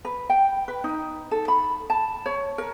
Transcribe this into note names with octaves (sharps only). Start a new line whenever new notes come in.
B4
G5
B4
D#4
A4
B5
A5
C#5
A#4